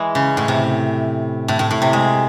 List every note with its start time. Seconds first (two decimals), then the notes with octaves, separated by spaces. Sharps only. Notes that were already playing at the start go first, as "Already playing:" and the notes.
Already playing: E3 G#3
0.15 C#3
0.37 A2
0.48 C3
1.48 A2
1.59 A2
1.71 A2
1.82 C3
1.93 G#3